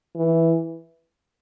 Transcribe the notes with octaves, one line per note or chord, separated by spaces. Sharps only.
E3